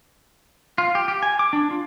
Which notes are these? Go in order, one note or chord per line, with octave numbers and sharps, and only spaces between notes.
F4
G4
G4
G#5
D6
D4
F4